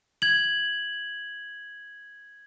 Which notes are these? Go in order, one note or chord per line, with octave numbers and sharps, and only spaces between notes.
G#6 F#7